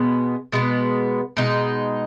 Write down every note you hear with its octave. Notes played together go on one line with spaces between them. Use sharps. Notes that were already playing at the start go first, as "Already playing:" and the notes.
Already playing: B2 G#3 B3
B2 G#3 B3
B2 G#3 D#4